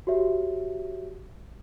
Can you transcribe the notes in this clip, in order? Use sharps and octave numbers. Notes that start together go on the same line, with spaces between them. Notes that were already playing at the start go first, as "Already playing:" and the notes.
F#4 G4 C#5 E5